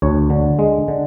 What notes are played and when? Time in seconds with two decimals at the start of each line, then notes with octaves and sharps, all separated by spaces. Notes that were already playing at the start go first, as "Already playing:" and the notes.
0.02 D2 C#5
0.30 D3
0.59 G#3
0.88 D3